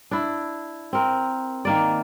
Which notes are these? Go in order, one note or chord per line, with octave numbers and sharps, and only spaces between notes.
D4 E4
C4 A#4
D#3 A#3 D5